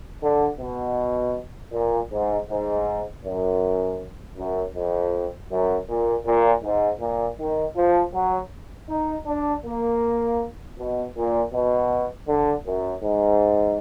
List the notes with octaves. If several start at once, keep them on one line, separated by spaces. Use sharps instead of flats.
D3
B2
A#2
G#2
G#2
F#2
F#2
F2
F#2
A#2
A#2
G#2
A#2
D#3
F3
F#3
D#4
D4
A#3
B2
A#2
B2
D3
F#2
G#2